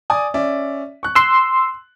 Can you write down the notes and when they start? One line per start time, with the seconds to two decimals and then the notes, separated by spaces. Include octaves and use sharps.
0.10 D5 G#5 D#6
0.34 C#4 D5 E5
1.03 C#6 F#6
1.15 C6 E6 F#6